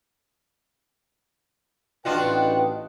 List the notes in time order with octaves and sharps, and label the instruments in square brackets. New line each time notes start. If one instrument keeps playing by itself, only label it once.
[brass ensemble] A1 G5 [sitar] D4 F4 F#4 [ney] B4 [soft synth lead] D#5